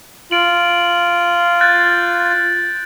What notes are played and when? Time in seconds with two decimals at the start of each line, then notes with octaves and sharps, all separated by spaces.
0.31 F4 D7 F#7
1.61 F#6 G6 A6